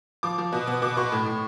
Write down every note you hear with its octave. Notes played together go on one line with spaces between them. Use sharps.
F3 D6
F3
B2
B3
B2 D6
B2 C#6
A2
A2